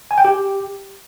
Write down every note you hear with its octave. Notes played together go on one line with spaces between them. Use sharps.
G#5
G5
G4